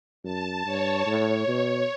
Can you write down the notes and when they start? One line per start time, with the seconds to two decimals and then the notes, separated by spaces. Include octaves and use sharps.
0.24 F#2 A5
0.66 G2 C#5
1.06 A2 C#5
1.47 B2